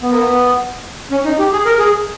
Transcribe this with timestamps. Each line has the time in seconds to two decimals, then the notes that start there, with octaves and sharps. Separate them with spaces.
0.02 B3
0.11 A#3
0.19 B3
1.11 C#4
1.25 D#4
1.39 G4
1.52 G#4
1.66 A#4
1.79 G#4